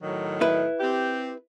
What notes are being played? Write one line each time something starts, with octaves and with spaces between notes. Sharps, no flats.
A2 D#3 F#3
E4 B4
C4 G4